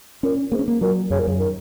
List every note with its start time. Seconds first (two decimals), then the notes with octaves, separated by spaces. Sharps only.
0.23 A#2 C#4
0.52 G#2 A#3
0.59 C#4
0.68 A#3
0.81 A#2 F#3
1.10 F#2 C#3
1.19 A#2
1.27 F#2 C#3
1.39 D#3